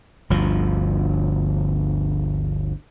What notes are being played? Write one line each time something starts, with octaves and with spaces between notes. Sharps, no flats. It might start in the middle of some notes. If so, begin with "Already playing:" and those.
G1 D2 F3